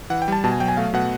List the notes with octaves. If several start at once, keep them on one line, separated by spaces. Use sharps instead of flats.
E3 F#5
G5
G3 A5
B2 A5
G#5
F#3 G5
G#5
A3 F5
B2 F#5